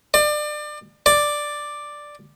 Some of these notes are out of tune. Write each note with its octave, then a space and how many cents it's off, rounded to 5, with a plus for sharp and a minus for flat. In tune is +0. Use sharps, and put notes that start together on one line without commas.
D5 +30
D5 +5